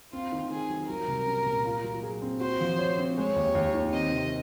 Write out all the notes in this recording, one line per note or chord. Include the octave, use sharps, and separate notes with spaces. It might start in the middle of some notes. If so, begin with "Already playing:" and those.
C4 F4
D#3
D#3 G#4
F#3
F#3 A#4
C2
C#4
A#2
F4
F#3
G#4
C4
F#4 C5
F3
C#5
C4
G#3 C#5
D#2
D#2
D#3
C4 D#5
C3